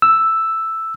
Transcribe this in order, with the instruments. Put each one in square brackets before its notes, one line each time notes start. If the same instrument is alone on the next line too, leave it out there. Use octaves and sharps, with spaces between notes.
[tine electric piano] E6